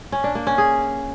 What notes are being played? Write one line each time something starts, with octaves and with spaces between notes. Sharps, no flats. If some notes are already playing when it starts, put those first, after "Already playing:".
C#4
D4
A#3
C#4
G#4